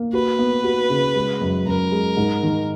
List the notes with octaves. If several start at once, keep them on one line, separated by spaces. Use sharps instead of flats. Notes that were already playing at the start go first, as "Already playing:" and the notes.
Already playing: A#3
F#4 B4
B3
F#4
C#3
G#3
F#2
F#2 A#4
G#3
G#2
D#3